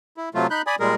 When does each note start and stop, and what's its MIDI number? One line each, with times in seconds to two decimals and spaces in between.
0.17 0.29 64
0.35 0.47 48
0.35 0.47 54
0.35 0.47 57
0.35 0.47 65
0.51 0.62 63
0.51 0.62 83
0.51 0.62 90
0.51 0.62 91
0.67 0.75 74
0.67 0.75 80
0.67 0.75 83
0.67 0.75 87
0.80 0.95 46
0.80 0.95 55
0.80 0.95 56
0.80 0.95 68
0.80 0.95 70